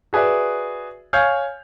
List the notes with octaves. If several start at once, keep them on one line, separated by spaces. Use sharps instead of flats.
F#4 G#4 B4 D5 E5
C#5 F5 G#5 F6 G6